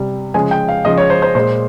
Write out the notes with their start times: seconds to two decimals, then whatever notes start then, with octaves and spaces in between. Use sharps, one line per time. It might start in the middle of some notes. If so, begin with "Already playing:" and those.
Already playing: C3 G3
0.34 C#3 F3 G#3 G#5
0.51 G5
0.68 F5
0.85 C#3 F3 G#3 D#5
0.98 C#5
1.10 C5
1.22 C5
1.35 A#2 G#3 C5